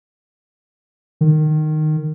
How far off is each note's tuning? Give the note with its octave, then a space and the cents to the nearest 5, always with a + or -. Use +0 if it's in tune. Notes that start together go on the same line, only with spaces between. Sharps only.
D#3 -15